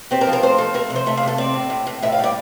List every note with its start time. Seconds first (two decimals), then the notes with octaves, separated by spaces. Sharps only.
0.11 C4 G4
0.21 A#4
0.27 F3
0.33 A#4
0.43 A3 C5
0.58 F3 A4
0.74 A3 A#4
0.90 C3
0.96 C5
1.06 A3 E5
1.17 F5
1.23 C3 A4
1.38 C4 D5
1.54 A2
1.70 A2
1.87 A2
2.03 A2 E5
2.12 F5
2.19 G3
2.24 D5